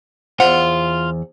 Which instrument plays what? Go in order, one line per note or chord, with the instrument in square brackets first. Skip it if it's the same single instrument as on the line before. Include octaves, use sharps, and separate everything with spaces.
[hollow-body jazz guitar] E2 F#5 [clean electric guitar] F4 [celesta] C5